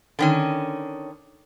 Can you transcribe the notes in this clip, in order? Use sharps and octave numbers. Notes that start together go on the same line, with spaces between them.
D3 D#3 C#4